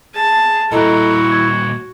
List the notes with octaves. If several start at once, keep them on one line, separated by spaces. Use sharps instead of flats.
G#4 A5
A#2 G3 E4 F#4 A4 D#5 A#5
G#6